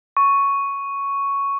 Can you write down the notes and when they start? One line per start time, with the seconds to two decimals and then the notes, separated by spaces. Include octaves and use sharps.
0.17 C#6